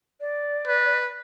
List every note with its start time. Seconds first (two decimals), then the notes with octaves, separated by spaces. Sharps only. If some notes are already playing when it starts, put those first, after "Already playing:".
0.20 D5
0.67 B4